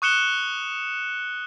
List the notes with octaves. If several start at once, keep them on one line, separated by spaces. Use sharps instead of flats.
C#6 D#6 F#6 C#7 E7 G7